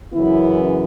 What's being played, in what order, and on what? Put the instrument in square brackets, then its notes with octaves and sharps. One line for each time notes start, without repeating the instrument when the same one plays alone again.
[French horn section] F#2 C#3 E3 B3 E4